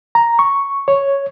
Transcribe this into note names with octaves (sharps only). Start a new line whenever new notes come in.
A#5
C#6
C#5